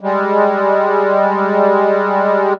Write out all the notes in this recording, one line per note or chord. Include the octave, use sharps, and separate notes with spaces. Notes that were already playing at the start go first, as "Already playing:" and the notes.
G3 G#3